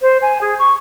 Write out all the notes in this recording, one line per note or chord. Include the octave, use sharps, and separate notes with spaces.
C5
G#5
G#4
C#6